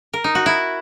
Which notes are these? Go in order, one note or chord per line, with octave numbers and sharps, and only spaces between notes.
A#4
D#4
F#4
E4